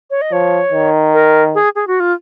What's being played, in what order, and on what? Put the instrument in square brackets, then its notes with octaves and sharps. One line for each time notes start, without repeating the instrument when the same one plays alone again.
[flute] C#5
D#5
[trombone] F3 [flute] C#5
[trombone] D#3
[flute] A#4
G#4
G#4
F#4
F4